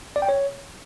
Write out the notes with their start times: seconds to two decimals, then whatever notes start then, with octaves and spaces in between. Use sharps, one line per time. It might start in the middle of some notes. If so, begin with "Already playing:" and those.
0.16 D5
0.22 G5
0.29 C#5